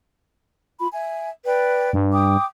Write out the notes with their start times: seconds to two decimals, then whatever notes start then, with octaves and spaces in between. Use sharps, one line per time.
0.79 F4 B5
0.92 E5 G#5
1.45 B4 D5 G5
1.93 G2
2.12 G5 D6 D#6